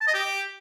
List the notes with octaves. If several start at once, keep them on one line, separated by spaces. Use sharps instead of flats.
A5
D#5
G4